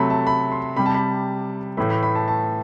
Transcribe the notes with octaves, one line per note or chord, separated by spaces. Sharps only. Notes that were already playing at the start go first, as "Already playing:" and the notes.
Already playing: C3 F#3 A3 A5 B5
A5
B5
C6
C3 G3 B5
A5
B5
A2 E3 A3 B5
B5
B5
A5
A5